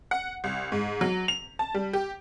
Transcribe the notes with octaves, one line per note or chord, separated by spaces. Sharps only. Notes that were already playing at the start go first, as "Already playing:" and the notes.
F#5
C2
G#2
F#3
F7
A5
G3
G4